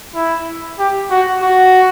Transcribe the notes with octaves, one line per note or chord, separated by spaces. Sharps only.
E4
G4
F#4
F#4